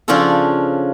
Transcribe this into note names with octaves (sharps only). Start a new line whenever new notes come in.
C#3 F3 C#4 D4 F4 A4